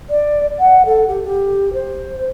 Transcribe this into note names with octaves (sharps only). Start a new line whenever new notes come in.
D5
F#5
A4
G4
G4
C5